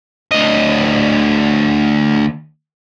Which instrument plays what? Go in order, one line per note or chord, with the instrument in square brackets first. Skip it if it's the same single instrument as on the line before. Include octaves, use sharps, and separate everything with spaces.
[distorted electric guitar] D2 D#5